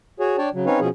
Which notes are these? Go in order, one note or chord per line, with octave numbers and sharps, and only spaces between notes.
F#4 G#4 C#5
D4 C#5 D5 G5 A5
C#3 F#3
C4 C#4 D#4 B4 C#5 F5
B2 F3 C#4 G#4